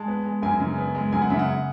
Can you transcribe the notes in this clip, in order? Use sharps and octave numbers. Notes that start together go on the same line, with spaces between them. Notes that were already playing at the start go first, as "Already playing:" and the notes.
Already playing: G#3 A5
B3
G#3
F#2 G#5
C#3
B3
G#3
F#2 G#5
F#5
C#3 E5
F#5